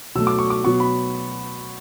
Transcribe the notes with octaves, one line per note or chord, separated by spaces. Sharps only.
B2 F#3 A3 E6
D6
C#6
D6
B2 F#3 B3 C#6
B5